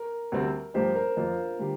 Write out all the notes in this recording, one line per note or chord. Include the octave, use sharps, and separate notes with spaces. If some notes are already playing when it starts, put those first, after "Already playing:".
Already playing: A#4
D2 C3 G3 C4
G2 F3 A#3 G4 C5
A#4
F2 F3 A#3 F4
D3 G3 A#3 G4